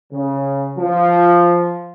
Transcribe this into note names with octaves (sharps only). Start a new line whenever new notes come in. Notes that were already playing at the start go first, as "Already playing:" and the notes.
C#3
F3